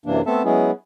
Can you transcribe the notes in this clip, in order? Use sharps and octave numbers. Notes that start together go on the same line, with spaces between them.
F#2 C3 E3 A#3 D4
A3 B3 C4 A4 E5 A5
F#3 G#3 B3 C#4 E4 G#4